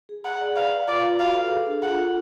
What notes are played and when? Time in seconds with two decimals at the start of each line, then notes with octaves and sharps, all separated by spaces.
0.09 G#4
0.24 G#4 F#5
0.41 D5
0.56 B4 F5
0.71 F5
0.88 F4 D5
1.03 B4
1.19 F#4 F5
1.35 A4
1.51 G#4
1.67 D4
1.83 F4 F#5
1.98 A4